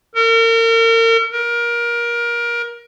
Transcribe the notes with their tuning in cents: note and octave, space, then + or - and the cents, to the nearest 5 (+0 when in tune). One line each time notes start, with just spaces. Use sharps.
A#4 -35
A#4 +25